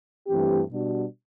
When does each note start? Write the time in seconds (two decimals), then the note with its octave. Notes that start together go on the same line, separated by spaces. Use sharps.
0.28 G2 E3 A3 C4 G4
0.71 B2 G3 D4 F#4